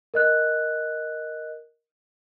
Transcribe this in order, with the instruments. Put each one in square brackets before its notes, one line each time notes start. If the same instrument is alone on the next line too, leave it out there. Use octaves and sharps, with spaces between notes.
[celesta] A#4 D#5 F#6